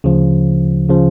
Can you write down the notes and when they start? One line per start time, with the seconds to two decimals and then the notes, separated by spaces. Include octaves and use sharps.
0.04 D2 C#3 F3
0.89 C#3 F3